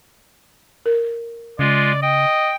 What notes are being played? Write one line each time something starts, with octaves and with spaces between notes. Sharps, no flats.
A#4
C#3 G#3 F4 D5
D#5 G5